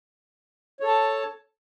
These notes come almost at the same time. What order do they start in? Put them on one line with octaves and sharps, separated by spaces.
C#5 A4 A5